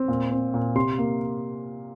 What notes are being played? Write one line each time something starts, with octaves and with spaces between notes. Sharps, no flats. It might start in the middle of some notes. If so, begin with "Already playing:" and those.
Already playing: C4
A#2
C4
A#2
C3 C6
A#3